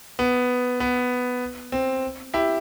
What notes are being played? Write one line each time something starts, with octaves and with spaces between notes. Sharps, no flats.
B3
B3
C4
E4 G4